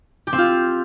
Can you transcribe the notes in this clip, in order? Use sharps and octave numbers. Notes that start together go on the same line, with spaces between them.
G4
C4
F4